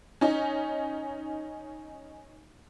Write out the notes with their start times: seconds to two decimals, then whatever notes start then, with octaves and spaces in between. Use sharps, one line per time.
0.21 C#4 D#4